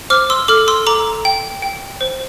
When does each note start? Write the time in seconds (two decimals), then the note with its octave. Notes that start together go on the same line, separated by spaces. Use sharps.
0.10 C5 D6 F6
0.30 C6 E6
0.48 A4 D6 F6
0.68 C6 E6
0.87 A4 A#5 D6
1.25 G5
1.62 G5
2.01 C5